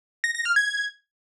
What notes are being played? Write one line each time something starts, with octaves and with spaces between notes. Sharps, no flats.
A#6
A#6
F6
G#6